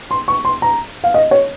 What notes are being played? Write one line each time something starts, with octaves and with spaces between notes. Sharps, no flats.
C6
C#6
C6
A#5
F5
D#5
C#5